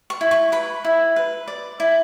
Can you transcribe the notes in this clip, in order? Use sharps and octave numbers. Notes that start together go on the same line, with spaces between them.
C#6
E4
C#6
B4 B5
E4
B4
D5
E4